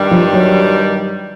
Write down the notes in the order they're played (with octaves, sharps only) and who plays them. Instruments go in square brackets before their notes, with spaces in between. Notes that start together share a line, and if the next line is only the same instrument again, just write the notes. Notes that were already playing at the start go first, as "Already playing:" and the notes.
Already playing: [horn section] G2 D#3 G3
[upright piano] F3
F#3